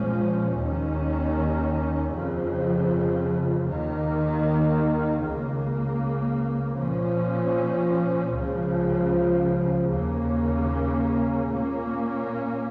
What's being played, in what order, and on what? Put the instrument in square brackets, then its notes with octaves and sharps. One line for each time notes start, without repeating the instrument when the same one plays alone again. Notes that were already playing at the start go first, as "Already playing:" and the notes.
Already playing: [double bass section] A#2 F3 G#3 C#4
D#2 D#3 C#4
F2 C#3 F3
D#2 D#3 A#3
C#2 C#3 A#3
A#2 F3 C#4
C#2 C#3 F3
D#2 C#3 A#3 C#4
A#2 A#3 C#4